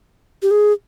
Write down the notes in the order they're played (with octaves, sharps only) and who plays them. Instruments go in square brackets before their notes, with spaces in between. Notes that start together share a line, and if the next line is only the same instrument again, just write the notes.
[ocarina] G4
G#4